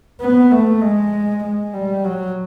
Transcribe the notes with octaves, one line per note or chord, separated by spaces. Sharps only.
B3
A3
G#3
G#3
G3
F#3